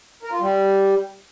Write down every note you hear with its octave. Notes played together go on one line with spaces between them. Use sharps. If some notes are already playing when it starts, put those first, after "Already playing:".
A#4
F4
G3